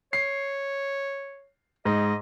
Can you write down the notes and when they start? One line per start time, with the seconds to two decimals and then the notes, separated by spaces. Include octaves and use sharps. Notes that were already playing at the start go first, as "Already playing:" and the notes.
0.13 C#5 C7
1.85 G#2 D#5